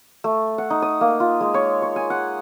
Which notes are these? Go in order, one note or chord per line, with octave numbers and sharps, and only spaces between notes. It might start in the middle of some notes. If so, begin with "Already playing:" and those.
A3
F#5
D#4
D#6
A#3
F4
G#3
C#5
C#5
G#5
F#5